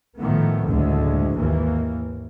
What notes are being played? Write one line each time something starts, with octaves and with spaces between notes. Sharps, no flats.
A2 D#3 F3 A3 B3
F#1 D2 A2 D3 G#3
G#1 D#2 E3 A#3